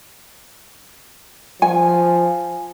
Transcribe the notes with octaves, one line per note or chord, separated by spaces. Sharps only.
F3 G#5